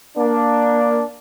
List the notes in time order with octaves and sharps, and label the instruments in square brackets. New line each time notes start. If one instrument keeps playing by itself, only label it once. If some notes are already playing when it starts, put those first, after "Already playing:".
[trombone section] A#3 D4